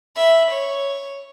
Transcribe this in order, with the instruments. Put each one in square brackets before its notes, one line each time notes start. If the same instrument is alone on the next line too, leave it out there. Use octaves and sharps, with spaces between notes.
[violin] E5 B5
C#5